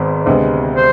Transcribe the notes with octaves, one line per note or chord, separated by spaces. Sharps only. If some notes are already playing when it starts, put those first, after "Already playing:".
Already playing: G#1 G#2 G#3 B3
D2 C3 G#3 B3
C5